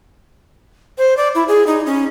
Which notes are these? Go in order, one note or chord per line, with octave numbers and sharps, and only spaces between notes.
C5
D5
E4
G#4
D#4
C#4